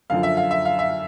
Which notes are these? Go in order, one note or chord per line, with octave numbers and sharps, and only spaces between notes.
F#2 D3 F3 F5
E5
F5
E5
F5
E5